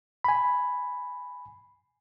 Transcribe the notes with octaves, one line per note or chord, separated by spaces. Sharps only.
G#5 B5